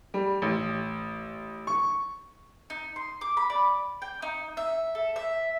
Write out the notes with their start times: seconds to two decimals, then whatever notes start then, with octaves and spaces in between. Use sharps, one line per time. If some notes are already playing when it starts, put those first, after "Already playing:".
0.14 G3
0.42 A1
1.67 C#6
2.70 D#4
2.96 C6
3.21 D6
3.37 B5
3.50 D5
4.02 G5
4.22 D#4
4.57 E5
4.95 A4
5.16 E5